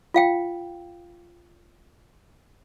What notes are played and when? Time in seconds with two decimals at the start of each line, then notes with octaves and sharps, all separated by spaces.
0.14 F4 F5 G5